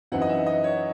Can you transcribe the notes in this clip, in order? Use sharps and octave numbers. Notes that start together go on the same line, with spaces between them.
F#2 E3 C4 D#4 F#5
D#5
E5
D#5
C#5